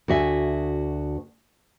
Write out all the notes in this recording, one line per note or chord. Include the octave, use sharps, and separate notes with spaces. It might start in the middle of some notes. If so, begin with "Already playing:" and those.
D2 F#4 E5 G#5